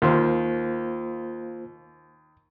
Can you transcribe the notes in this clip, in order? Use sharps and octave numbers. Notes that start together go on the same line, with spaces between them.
D#2 A#3 F4 C5